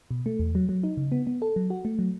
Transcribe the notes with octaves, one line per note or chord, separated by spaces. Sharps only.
B2
A3
E2
F#3
F#3
D#4
C#3
B3
B3
A4
F#3
F#4
A3
F#3